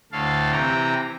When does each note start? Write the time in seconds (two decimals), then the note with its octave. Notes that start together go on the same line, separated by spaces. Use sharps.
0.12 D2 A2 A4 F5
0.52 C3 E3 G5 A#5